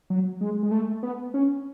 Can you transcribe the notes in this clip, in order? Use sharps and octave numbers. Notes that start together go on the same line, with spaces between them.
F#3
G#3
G#3
A3
B3
C#4